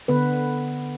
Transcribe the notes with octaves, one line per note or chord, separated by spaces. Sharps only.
D3 B3 B4